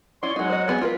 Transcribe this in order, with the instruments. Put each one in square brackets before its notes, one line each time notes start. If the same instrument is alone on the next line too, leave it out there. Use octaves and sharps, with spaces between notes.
[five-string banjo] C#4 E4 [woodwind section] D5 C6 C#6
[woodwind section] F#3 G#3 F#4 [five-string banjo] D#4 G#4
[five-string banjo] C5 D#5
G3 B3 G#4
F4 A#4 B4